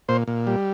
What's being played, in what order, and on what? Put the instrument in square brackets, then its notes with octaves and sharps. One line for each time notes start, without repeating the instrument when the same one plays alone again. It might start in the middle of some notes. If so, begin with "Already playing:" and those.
[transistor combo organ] A#2 C5
A#2
G3